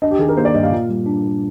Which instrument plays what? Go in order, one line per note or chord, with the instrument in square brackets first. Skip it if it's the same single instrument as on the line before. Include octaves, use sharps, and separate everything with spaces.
[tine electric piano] D4 [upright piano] D#5
[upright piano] G4
[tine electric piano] D#3 [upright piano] G#4
[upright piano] A#4
[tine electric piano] A#3 [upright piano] C5
[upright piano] D5
[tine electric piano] G2 [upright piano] D#5
[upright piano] F5
[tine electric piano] A#2
G3
D4
A#2